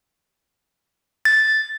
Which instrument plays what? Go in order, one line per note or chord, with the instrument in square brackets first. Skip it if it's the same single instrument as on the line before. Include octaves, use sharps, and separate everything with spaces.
[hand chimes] A6